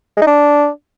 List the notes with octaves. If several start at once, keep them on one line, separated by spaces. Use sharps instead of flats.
G#3
D#4
D4